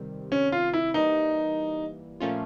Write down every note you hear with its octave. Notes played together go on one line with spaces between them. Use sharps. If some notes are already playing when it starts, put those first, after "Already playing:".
Already playing: C3 D#3 G3 C4
C#4
F4
E4
E3 G3 A#3 D#4
A#2 F3 A3 C#4 F4